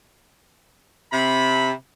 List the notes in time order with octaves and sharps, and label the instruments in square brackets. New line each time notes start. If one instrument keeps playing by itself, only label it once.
[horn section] C3 B5